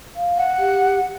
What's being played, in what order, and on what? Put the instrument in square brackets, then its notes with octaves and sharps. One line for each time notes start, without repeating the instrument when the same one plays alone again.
[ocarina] F5
[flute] F#5
[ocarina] G4